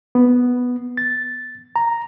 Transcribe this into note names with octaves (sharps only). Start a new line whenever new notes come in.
B3
A6
A#5